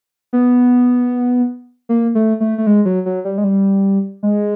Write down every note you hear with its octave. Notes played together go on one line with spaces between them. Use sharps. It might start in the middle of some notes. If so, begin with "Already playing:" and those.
B3
A#3
A3
A3
A3
G#3
F#3
F#3
G3
G#3
G3
G#3